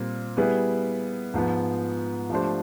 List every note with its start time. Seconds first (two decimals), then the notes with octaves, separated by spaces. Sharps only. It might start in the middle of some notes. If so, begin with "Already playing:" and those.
Already playing: A#2 G3 C4
0.37 G3 B3 E4 G#4 B4
1.34 G#2 F3 G#3 B3
2.30 F3 A3 D4 G4 C5